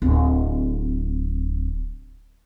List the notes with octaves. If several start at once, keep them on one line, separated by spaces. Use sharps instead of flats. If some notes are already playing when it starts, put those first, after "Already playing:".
D1 C4